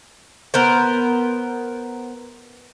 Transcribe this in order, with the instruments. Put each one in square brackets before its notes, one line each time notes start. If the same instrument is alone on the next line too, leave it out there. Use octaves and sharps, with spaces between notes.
[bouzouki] B3 A#4 C5